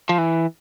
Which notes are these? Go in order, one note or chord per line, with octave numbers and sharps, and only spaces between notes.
F3
E3